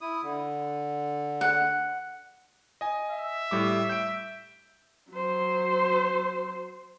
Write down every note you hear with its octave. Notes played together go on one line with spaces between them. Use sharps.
E4 D#6
D3
F#5
D#5 G#5
E5
A2 G3 D6
G6 D7
F#3 C5